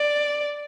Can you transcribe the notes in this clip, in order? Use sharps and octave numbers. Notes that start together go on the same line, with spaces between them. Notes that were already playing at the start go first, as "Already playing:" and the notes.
Already playing: D5